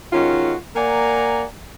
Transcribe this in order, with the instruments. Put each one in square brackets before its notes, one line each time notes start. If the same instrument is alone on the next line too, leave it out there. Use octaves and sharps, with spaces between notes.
[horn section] D#3 G#3 C#4 F4 F#4
A#3 D5 F#5 G#5 A#5